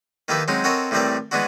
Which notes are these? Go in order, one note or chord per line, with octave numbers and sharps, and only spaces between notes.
D#3 A#3 E4 G4 A4 B4
F#3 G#3 C4 C#4 D#4
C4 F#4 A4 A#4 C#5 D#5
A2 E3 G3 C4 A#4 D5
E3 G#3 B3 D4 E4 F#4